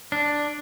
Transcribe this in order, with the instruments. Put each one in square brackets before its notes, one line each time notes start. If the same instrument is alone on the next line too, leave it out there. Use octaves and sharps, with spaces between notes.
[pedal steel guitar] D4